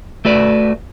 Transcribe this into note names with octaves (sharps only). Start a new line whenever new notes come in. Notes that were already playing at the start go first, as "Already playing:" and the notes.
A3 F#4 B4 D5